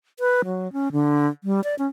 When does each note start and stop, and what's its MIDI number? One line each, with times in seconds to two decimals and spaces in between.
0.20 0.41 71
0.45 0.71 54
0.73 0.92 61
0.92 1.27 50
1.44 1.63 55
1.64 1.75 74
1.79 1.87 61